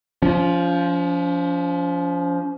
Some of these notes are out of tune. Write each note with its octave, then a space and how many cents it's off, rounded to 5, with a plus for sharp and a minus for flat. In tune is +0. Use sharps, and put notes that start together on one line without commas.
F3 +0 C#4 +40